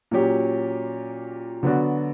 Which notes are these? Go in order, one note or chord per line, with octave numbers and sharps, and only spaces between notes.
A#2 F#3 C#4 G4
D3 F#3 B3 D4 F#4